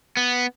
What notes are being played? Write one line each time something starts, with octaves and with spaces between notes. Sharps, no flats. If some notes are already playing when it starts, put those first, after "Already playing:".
B3